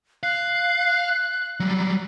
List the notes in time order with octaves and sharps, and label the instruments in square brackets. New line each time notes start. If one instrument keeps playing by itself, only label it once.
[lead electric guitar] F5 [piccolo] F#6
[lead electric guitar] F#3 G3